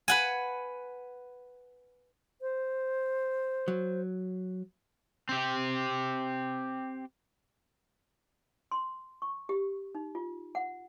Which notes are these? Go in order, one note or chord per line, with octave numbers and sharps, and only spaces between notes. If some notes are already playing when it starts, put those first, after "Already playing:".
B4 F#5 G#5
C5
F#3
C4 G4
C6
C#6
G4
D#4
F4
F#5